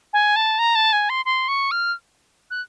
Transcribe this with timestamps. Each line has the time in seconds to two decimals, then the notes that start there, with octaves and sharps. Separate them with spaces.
0.13 G#5
0.36 A5
0.59 A#5
0.75 A5
0.93 G#5
1.09 C6
1.25 C6
1.48 C#6
1.71 F6
2.50 F#6